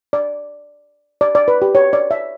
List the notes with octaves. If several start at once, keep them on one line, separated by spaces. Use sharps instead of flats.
D5
D5
D5
B4
G4
C#5
D5
E5